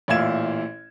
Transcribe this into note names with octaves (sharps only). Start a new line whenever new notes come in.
A1 A#2 E4 F5 G#6 E7